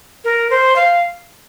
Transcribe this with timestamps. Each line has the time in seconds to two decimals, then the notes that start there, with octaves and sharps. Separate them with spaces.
0.24 A#4
0.50 C5
0.76 F5